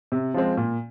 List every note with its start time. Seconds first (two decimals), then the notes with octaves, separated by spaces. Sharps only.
0.12 C3
0.34 F3 G#3 C4
0.57 A#2